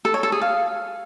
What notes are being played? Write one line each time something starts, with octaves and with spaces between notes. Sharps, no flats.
A4
C#5
A4
G#4
F5